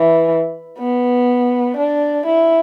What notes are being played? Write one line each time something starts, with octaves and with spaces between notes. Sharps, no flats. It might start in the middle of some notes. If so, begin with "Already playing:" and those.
Already playing: E3
B3
D4
E4